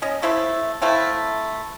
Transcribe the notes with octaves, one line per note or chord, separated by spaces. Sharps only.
C#4 D#5
A3 E4 C5 E5
A3 C4 E4 F5